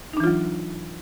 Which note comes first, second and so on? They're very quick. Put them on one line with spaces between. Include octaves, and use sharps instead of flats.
D#4 D4 E3 F4 F#3